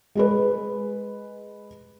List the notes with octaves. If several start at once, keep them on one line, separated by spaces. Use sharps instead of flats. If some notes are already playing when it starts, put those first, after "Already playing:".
G#3 G#4 B4